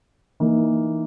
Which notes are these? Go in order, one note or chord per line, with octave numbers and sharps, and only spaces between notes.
E3 A#3 D#4